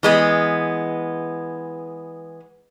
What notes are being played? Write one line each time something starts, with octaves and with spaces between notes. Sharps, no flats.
E3 G#3 B3